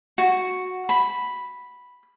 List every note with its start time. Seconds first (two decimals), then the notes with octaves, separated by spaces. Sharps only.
0.18 F#4
0.89 B5